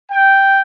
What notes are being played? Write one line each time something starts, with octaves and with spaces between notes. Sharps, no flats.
G5